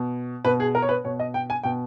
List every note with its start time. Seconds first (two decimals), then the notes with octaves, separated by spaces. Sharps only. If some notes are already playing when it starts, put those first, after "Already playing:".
Already playing: B2
0.44 B2 B4
0.60 G#4
0.75 A#4
0.82 C#5
0.89 B4
1.05 B2 C#5
1.19 D#5
1.34 G5
1.50 G#5
1.63 B2 G5